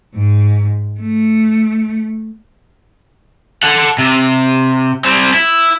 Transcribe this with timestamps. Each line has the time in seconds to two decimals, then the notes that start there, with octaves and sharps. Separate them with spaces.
0.14 G#2
0.98 A3
3.63 A4 F#5
3.99 C3
5.05 G3 C4
5.34 E4